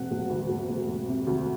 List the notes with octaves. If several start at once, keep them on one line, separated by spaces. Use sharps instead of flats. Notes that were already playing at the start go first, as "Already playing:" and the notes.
Already playing: E1 C3 F#5
E1
D2
E1
E1
E1
C3
D2